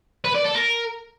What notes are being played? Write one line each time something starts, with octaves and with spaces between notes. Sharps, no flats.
B4
D5
A4
A#4